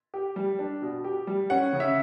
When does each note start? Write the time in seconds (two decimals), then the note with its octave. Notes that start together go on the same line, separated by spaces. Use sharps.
0.14 G4
0.36 G3
0.59 D4
0.82 B2
1.04 G4
1.27 G3
1.50 C#4 F#5
1.73 C#3
1.80 E5